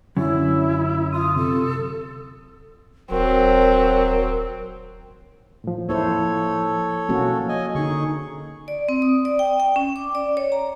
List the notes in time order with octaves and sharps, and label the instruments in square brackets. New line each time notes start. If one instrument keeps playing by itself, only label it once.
[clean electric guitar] F#2 D3 F#3 [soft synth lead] C#4 [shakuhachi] E4
[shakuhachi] F4 [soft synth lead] D#6
[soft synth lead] C3 [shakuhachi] A4
[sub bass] D#1 [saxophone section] F#3 [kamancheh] C4 [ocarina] A#4
[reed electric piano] A2 F3
[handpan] A#3 E4 C5 [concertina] A4 C#5
[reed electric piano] B2 F3 F#3 [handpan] A#3 C#4 F#4
[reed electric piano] C#5 [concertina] D#5 G#5
[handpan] D3 D#4 [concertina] G#4 C#6
[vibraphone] D5
C4
D#6
D5
G5
G5
C#4
D6
D5
C#5
A#5